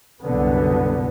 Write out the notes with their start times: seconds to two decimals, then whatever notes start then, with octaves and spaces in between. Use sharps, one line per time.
0.22 C2 F#2 B2 D3 B3